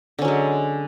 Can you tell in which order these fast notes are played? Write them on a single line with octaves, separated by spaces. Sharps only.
D3 C#4 F#3 G#3